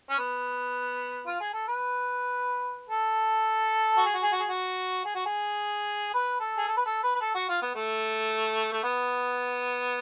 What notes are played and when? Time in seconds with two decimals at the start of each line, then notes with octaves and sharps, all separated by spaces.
0.10 C#4
0.19 B3
1.27 F4
1.40 G#4
1.53 A4
1.68 B4
2.89 A4
3.97 F#4
4.06 G#4
4.14 F#4
4.23 G#4
4.32 F#4
4.40 G#4
4.49 F#4
5.05 G#4
5.15 F#4
5.26 G#4
6.14 B4
6.40 A4
6.58 G#4
6.67 A4
6.77 B4
6.85 A4
7.03 B4
7.15 B4
7.21 A4
7.34 F#4
7.49 F4
7.62 B3
7.75 A3
8.72 A3
8.83 B3